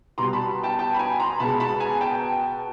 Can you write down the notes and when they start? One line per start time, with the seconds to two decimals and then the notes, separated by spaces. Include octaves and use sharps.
0.18 B2 G3 A#5 C6
0.33 A5 B5
0.63 G5 A5
0.79 G5 A5
0.94 B5
0.99 G#5 A#5
1.19 A#5 C6
1.40 B2 G#3 A5 B5
1.60 A5 B5
1.80 G#5 A#5
2.01 G5 A5